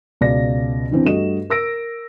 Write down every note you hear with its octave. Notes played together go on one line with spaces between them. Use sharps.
C#2 B2 D5 A#6
D3 E3 C4 D4
G2 A3 F#4 D#5 E7
A#4 E6 A#6 D7